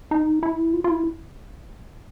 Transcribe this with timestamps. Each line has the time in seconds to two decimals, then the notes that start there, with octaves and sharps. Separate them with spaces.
0.11 D#4
0.43 E4
0.73 F4
0.84 F4
0.90 E4